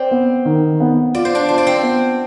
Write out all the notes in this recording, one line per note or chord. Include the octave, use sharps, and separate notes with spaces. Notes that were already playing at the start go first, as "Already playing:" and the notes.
Already playing: C4 C5 D5
B3
D#3
B3
F4 D5
C5
D4 D5
F4 C5
D5
C4 C5
B3